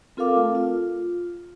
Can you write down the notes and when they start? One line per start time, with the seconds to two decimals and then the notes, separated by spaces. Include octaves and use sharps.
0.17 C4 F4 A4 A#4 F5 D6
0.37 A3
0.55 F4